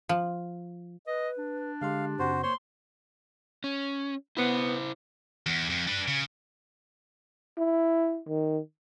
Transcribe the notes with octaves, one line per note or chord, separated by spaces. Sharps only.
F3
B4 D#5
D4
D3 G#3 G4 F5 C6
F#2 C#3 C4 F#4 C5
A#3 C5 C#5 C6
C#4
B3 E4 C5
E2
F2
D4 B4
C#3
E4
D#3